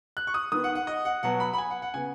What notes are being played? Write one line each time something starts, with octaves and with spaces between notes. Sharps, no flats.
F#6
C#6
D#6
D#3 B3 D#6
F#5
F#5
D#5
F#5
B2 F#3 B3 F#5
B5
B5
G#5
F#5
F#5
C#3 B3 G#5